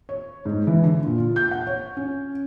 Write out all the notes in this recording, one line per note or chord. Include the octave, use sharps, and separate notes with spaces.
C#5
G#2
E3
D3
A#2
F4
G6
F#5
C#5
C#4